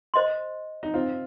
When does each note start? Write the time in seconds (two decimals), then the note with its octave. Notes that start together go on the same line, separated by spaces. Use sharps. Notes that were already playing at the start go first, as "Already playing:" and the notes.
0.14 C5 D#5 C6
0.83 D#4
0.94 C4 F4